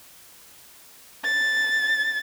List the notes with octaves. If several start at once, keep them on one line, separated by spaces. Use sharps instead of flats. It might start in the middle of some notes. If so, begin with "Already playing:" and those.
A6